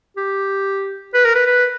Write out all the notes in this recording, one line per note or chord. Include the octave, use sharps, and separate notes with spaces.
G4
B4
A#4
B4
B4